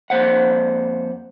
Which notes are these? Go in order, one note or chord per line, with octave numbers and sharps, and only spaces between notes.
F2 A#3 C5 F#5